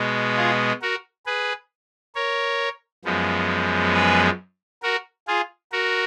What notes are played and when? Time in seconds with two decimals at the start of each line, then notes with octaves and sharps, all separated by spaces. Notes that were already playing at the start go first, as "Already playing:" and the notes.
Already playing: B2 G#3 B3
0.37 F4 G#4
0.82 F#4 A#4
1.26 G#4 B4
2.15 A#4 C#5
3.05 F#2 F3 G#3 B3
3.94 G#4 B4
4.83 F#4 A#4
5.28 F4 G#4
5.72 F#4 A#4